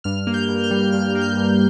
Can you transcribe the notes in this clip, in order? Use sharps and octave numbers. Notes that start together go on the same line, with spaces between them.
G2 F6
A#3
G6
G2
F6
G3
G2 F6
A#3
G6
G2